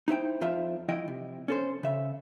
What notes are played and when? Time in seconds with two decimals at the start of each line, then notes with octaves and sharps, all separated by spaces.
0.08 D#4 E4 C5 G5
0.41 F2 F3 F4 C5 E5 A5
0.88 F3 E4 D#5 G5
1.08 C3
1.48 C#4 A4 C5
1.83 C#3 E5